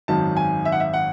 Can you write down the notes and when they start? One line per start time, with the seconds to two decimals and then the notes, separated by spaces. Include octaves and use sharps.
0.08 G#1 F#2 D#3 F#3 A5
0.37 G#5
0.65 E5
0.72 F#5
0.80 E5
0.94 F#5